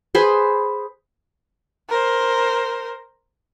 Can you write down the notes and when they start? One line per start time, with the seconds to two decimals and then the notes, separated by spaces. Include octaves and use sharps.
0.15 G#4 B4 C5
1.89 A#4 C5